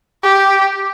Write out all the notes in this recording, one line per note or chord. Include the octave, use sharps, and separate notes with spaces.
G4